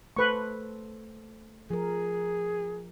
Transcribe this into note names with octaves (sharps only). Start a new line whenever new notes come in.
A3 A4 B4 C5 C#6
F3 G#4 A#4